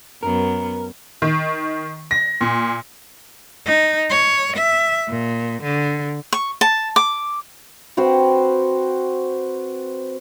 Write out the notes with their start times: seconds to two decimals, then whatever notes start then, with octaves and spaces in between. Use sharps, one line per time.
0.23 F#2 B3 A#4
1.22 D#3
2.11 A#6
2.41 A#2
3.66 D#4
4.10 C#5
4.56 E5
5.08 A#2
5.63 D3
6.33 C#6
6.61 A5
6.96 D6
7.97 C4 F#4 B4 C5